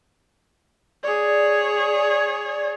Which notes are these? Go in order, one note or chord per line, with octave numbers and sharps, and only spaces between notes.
G#4 C#5 D5